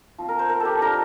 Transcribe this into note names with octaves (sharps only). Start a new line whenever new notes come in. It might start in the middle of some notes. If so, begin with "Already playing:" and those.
F3 C4 F4
A#4
C5
A#4
G4 A4
G3 D4 F4 A#4